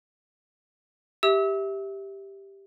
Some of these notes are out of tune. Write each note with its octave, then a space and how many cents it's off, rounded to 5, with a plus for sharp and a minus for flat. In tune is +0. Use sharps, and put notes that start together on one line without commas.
G4 +0 E5 -10 E6 -35